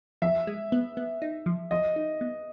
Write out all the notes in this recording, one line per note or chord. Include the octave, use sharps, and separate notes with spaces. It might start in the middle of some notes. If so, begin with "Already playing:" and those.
F3 E5
G#3
B3
B3
D#4
F3
F3 D#5
D#4
B3